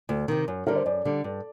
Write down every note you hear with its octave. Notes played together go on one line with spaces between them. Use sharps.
D2
C3 D#3
F#2
D3 G3 A#4
C5
F#2 D5
D3 G3
G2